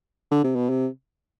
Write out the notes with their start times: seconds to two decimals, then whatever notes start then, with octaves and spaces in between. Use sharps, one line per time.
0.32 D3
0.44 C3
0.56 B2
0.70 C3